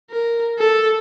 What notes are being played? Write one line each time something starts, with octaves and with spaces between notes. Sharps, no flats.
A#4
A4